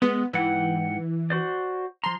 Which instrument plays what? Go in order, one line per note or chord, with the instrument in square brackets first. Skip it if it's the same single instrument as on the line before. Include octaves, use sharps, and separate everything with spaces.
[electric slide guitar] G#3 [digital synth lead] B3
[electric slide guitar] G#2 F#5 G5 [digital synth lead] E3
[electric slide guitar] F#4 C5 D5
[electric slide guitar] F3 A#5 [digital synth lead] C6